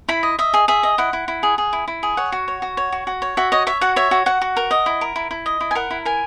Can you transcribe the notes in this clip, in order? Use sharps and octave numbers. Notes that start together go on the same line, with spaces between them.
E4 B5
D#5
D#5 E5
G#4
G#4 E5
D#5
E4 F#5
E4
E4
G#4
G#4
E4
E4
G#4
C#5 F#5
F#4
C#5
F#4
C#5
F#4
F#4
C#5
F#4 E5
C#5 D#5
C#5 E5
F#4 F#5
C#5 E5
F#4
F#4 F#5
F#4
A#4
D#5
E4
A#4
E4
E4
D#5
E4
G#5
A#4 F#5
E4
A#4 G#5